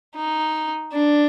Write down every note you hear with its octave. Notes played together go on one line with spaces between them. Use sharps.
D#4
D4